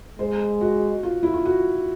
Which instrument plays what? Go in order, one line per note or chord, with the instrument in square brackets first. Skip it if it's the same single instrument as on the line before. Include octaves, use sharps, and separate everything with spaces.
[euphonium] G#3 [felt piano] C5
[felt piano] F#4
F4
E4
F4
F#4